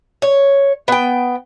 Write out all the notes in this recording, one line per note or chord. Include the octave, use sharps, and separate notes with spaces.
C#5
B3 G5